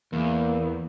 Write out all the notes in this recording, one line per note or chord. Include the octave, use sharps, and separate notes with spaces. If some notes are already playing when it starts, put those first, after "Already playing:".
E2 A#3